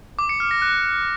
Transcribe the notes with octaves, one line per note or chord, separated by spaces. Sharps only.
D6
C#7
F6
A#6
F#6